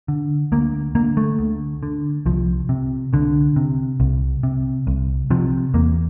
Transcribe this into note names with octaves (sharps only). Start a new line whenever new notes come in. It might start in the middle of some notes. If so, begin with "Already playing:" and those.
D3
D2 A#3
D3 A#3
A3
D2
D3
C2 F3
C3
C2 D3
C3
C2
C3
C2
C3 F3
E2 A#3